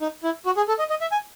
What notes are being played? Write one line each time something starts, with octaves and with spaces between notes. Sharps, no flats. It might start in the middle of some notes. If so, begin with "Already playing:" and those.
D#4
E4
F#4
G#4
A4
D#5
D#5
E5
G#5